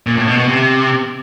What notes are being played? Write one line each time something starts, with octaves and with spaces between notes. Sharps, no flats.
A#2
A2
B2
B2
C3